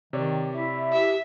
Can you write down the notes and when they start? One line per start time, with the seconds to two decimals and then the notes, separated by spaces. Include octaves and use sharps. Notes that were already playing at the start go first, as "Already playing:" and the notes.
0.13 C3 D#3 C#5 D5
0.53 E4 E5
0.92 G4 E5